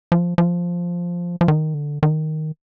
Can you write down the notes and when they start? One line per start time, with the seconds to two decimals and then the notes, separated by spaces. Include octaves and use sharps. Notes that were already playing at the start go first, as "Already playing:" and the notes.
0.12 F3
0.38 F3
1.41 F3
1.48 D#3
1.74 D3
2.03 D#3